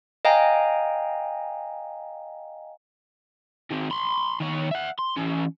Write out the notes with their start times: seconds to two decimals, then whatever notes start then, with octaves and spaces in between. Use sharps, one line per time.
0.25 D#5 F5 G5 G#5 A#5
3.71 D#3 C4
3.91 B5 C6
4.40 D#3 C#5
4.71 E5 F#5
4.99 C6
5.17 E3 C#4